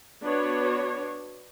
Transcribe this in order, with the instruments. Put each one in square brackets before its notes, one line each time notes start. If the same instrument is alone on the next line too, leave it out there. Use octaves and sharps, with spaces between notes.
[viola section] B3 D4 F#4 C#5